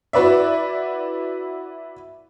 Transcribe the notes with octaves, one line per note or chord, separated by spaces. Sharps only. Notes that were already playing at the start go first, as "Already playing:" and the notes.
E4 F#4 B4 D5 E5